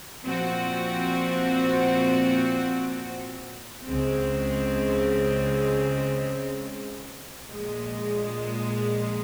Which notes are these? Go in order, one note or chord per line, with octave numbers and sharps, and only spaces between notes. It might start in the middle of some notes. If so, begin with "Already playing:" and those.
A#2 F3 C4 F#4
C#2 C#3 G#3 C4
A#1 A#2 G#3